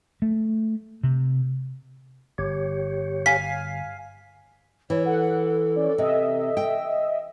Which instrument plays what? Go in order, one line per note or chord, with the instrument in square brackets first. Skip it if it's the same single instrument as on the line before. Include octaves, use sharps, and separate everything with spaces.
[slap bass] A3
C3
[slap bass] G1 [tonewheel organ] G4 C#5
[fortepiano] F5 G#5 [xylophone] B6
[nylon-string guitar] E3 [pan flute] C#5
[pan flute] A4 [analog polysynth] F#5
[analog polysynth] C#4 D5
[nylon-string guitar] C3 [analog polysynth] D#5 E5
[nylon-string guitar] G5